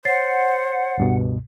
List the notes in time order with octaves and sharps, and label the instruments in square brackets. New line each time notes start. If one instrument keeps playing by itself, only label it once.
[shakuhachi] C5 [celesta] C#5 A6 C7 [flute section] F#5
[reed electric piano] C#2 G2 B2